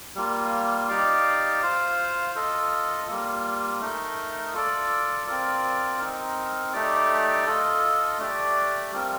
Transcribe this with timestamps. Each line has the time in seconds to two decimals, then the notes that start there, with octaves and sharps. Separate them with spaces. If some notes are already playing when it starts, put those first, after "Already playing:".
0.15 G3 A#3 F4
0.88 D#4 G4 D5 F5
1.62 F4 C5 F5
2.35 F4 A4 D#5
3.08 G3 A#3 F4
3.81 A3 D#4 A#4 D#5
4.54 F4 A4 D5
5.27 C4 F4 A#4 D5
6.00 C4 D#4 A#4
6.73 A3 D#4 G4 D5
7.46 F4 A4 D#5
8.19 A3 D4 G4 D5
8.92 G3 C4 F4 A#4